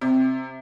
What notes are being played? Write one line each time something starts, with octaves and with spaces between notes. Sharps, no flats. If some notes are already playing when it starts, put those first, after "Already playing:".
C3